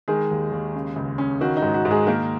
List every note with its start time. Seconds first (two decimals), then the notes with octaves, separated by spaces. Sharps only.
0.08 D#3 G#3 G#4
0.31 D#2
0.52 D#2
0.75 C#3
0.96 C#2
1.18 C#4
1.41 D#3 F#4
1.57 D#4
1.62 G#2
1.74 F#4
1.85 G#2
1.91 G#3 G#4
2.07 D#3 A#3 A#4